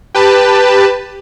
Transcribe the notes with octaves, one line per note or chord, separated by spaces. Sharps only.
G4 B4 A5